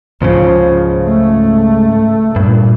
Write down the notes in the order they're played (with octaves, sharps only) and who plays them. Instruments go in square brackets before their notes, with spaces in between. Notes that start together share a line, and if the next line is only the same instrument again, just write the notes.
[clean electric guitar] C#2 G#2 C#3 [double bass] F3
[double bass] A3
[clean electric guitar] G2 [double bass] A#2